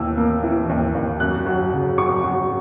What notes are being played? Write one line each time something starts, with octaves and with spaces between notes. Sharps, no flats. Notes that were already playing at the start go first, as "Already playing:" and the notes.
Already playing: D#2 E3 E6
A#3
E3
D#2
D#2
F#2 F#6
F#3
C#3
F#3 C#6
F#3